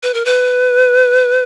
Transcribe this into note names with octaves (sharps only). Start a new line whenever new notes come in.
B4
A#4
B4